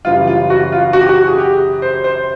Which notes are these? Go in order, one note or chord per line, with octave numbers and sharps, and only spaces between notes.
F#2 C#3 E3 G3 F4
F4
F#4
F4
F#4
G4
F#4
G#4
G4
C5
C5